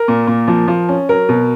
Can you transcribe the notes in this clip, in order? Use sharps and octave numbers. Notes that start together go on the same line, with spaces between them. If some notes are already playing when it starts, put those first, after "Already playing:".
Already playing: A#4
A#2
A#2
F3
F3
C#4
F#3 A#4
B2